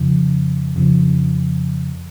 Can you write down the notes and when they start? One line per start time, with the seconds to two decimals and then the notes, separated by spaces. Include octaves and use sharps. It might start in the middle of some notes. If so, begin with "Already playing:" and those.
Already playing: F2 C#3 F3
0.76 F2 C#3 F3